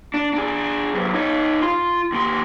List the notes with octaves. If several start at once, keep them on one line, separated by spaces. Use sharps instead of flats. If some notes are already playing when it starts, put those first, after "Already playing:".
D4
D4 G#4
C3 F#3
D#4 C#5
F4 C6
D#2 C6